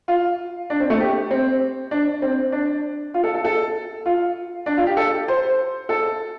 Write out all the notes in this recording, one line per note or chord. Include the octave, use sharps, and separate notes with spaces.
F4
D4
C4
A3
G4
C4
D4
C4
D4
F4
A4
A4
A4
F4
D4
F4
G4
A4
C5
A4